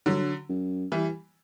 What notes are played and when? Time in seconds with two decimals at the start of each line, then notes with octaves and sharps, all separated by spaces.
0.06 G2 D3 F#3
0.49 F#2
0.92 E3 G3